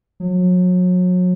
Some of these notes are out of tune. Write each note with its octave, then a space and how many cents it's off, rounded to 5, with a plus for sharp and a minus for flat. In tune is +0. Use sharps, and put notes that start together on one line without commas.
F#3 -35